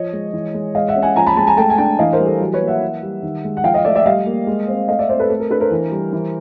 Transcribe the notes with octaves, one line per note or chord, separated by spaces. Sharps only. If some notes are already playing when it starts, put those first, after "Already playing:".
Already playing: F3 C#5 D#5
G#3
E3
G#3
G#3 D#5 F5
E5 F#5
C#4
F#5 G#5
F3 G#5 A#5
A5 B5
G#3 A5 B5
G#5 A#5
A3 G5 A5
G#5
D4 G5 A5
E3 D#5 F5
A#4 C5
G3
A4
F#3
B4 C#5
A#3
E5 F#5
E3
G3
D#3
G#3
F#5
F3 F5 G5
D#5 F5
A3 D5 E5
D5 E5
G3 D#5 F5
A#3
G#3
C4
A3 D#5 F5
D5 E5
C4 C5 D5
A4 B4
A3 A4
A#4
D4 A4 B4
A#4 C5
E3
G3
E3